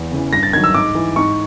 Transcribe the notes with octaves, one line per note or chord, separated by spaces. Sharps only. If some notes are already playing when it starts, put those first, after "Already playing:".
Already playing: E2
C#3 E3
G2 A#6
A6
D#3 F#3 G#6
E6
G#2 D6
E3
G#2 C#6